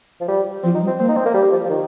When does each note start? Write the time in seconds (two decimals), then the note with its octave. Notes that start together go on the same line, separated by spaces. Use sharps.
0.21 F3
0.28 G3
0.63 F3 C4
0.75 D#4
0.82 G3
0.87 C4
0.99 A#3 C4
1.08 D#4
1.16 C4
1.25 A#3
1.34 G3 G4
1.52 F3
1.65 F3
1.70 D#3